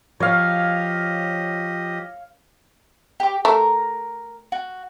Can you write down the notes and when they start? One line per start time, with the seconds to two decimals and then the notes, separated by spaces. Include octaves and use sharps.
0.20 F3 G4 C#5 D#5 F5
3.20 G4 D6
3.45 A3 A#4
4.52 F#4